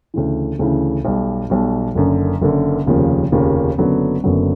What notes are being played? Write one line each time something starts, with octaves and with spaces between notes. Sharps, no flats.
D2 C#3 E3
D2 C#3 E3
B1 B2 G3
B1 B2 G3
F#1 F#2 D3
F#1 F#2 D3
F1 D#2 C#3 F3 A#3
F1 D#2 C#3 F3 A#3
F#1 F#2 D3 F#3 B3
F#1 F#2 D3 F#3 B3